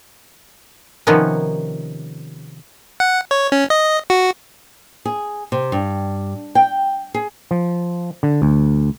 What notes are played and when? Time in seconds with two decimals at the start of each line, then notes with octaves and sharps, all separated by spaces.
1.07 C3 D#3 F3 A#3 B3 C#4
3.00 F#5
3.31 C#5
3.52 C#4
3.70 D#5
4.10 F#4
5.05 G#4
5.52 C3
5.72 G2
6.55 G5
7.14 G#4
7.51 F3
8.23 D3
8.42 D2